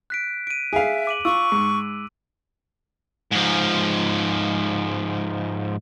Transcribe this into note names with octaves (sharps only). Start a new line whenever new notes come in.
F#6 B6 D7
D7 D#7
G#4 E5 F5
D6 D#7 F#7
F4 C#6 E6
G#2
G#2 F3